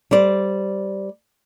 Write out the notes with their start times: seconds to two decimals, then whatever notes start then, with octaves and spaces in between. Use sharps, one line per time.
0.11 G3 C5 D5